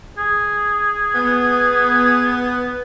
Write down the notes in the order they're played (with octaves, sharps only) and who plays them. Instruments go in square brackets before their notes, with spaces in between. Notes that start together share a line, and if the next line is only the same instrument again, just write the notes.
[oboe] G#4
[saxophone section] B3